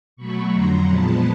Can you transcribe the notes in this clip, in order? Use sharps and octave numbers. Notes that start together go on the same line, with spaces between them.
B2 F#3 A3 B5 C#6
F2 D3 F#3 A#5 C6
A#2 F3 G#3 B3 A5 B5